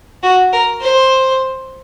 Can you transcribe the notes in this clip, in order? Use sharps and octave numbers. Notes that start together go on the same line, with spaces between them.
F#4
A#4
C5